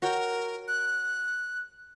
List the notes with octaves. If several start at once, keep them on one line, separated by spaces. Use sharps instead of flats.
F#4 A#4 C#5 G5
F#6